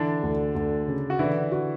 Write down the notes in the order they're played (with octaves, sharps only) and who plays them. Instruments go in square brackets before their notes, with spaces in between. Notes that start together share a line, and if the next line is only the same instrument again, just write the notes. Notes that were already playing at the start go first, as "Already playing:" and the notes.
Already playing: [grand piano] D3 D4 [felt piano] E3
[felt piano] D2
D2
C#3
[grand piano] F#4
[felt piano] D3 [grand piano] E3 E4
[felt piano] F#4